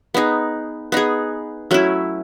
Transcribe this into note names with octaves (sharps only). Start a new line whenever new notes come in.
B3 D#4 G#4
B3 D#4 G#4
F#3 A3 C#4 E4